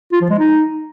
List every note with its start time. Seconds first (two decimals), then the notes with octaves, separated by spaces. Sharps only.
0.12 F4
0.21 F3
0.30 G#3
0.39 D#4